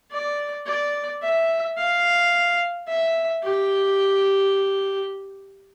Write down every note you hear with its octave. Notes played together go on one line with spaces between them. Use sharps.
D5
D5
E5
F5
E5
G4